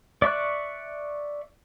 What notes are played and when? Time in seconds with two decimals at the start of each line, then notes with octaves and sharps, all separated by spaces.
0.22 D5 E5 C#6 F#6